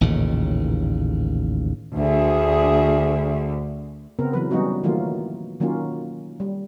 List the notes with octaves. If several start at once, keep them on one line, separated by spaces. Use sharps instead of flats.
A1 D#2 A#2 C#3
D2 G#4 E5
C#3 B3 C4 A#4
E3 F#3 B4
F#3 G3 B3 C#4 D#4 F#4
D#3 E3 F#3 A3 A#3 F4
D#3 F#3 A#3 C#4 F4
G3